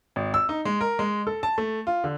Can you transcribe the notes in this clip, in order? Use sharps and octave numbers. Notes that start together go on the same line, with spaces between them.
G#1
E6
D#4
G#3
A#4
G#3
A4
A5
A3
F4
D3